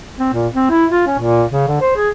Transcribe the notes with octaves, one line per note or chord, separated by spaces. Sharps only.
C4
A#2
C4
E4
F4
C#4
A#2
C#3
D3
C5
G#4